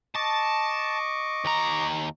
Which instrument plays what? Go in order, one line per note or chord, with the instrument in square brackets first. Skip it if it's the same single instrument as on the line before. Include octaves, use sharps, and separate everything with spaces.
[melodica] D#5 C#6 D6 [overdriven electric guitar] A5
[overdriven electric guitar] D#2 A#5